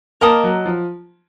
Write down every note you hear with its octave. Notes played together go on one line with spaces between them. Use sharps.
A#3 A#4 D#5 A5 D#6
F#3
F3